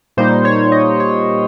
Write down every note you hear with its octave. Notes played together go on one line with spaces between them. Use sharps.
A#2 G3 A#3 D#4 C5
C#5
D#5
C#5